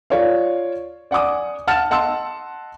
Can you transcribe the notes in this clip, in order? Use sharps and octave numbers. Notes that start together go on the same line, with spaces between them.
F4 C#5 D5 F5
D5 F#5 G#5 D6 D#6
F#5 A5 F6 A6 E7
D#5 F#5 A5 C6 E6